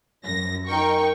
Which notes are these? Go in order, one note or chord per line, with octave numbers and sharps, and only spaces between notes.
F#2 A#6
D#4 A#4 G5 C#6